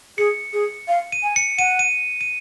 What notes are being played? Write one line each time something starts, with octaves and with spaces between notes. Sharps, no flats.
G#4 C#7
G#4
F5
D#7
G#5
C#7
F#5 D#7
D#7
D#7